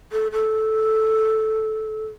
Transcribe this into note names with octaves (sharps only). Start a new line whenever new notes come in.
A4
A4